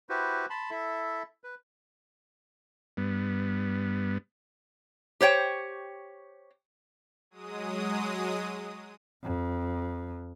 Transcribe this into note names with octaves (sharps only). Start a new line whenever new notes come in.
E4 F#4 G4 B4 C5
A5 B5 C6
E4 A4 E5
B4
G2 B3
G4 C5 C#5 G5
F#3 G#3 D#6
F2